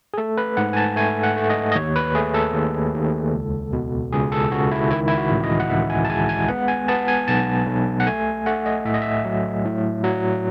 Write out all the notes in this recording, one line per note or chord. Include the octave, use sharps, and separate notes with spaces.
G#4
A3 A4
B4
G#2 F#5
G#5
A5
A3 G#5
F#5
A3
D#5
D#5
D#2 C#5
B4
A3 G#4
A4
D#2
D#2
C#2
B2
C#2 G#4
A4
C#2 F#4
E4
D#3 E4
E4
F#4
A1
D#5
F#5
A1 E5
G#5
A5
G#3 G#5
G#5
B3 F#5
G#5
B3 A5
G#5
B1 A5
B1
F#5
A3 G#5
A3 F#5
D#5
A2 E5
D#5
E5
F#3
A2
F#3